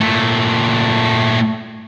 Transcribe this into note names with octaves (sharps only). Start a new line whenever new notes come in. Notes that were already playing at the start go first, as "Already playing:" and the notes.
A#2 A3